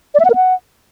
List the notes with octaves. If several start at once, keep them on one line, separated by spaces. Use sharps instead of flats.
D5
E5
F#5
A#4
F#5